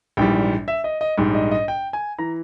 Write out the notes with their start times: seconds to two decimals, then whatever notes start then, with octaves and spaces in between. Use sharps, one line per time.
0.17 A#1 G#2 E3 G3 G5
0.68 E5
0.84 D#5
1.01 D#5
1.18 A#1 G#2 G3
1.35 D#5
1.51 D#5
1.68 G5
1.93 G#5
2.19 E3 A#5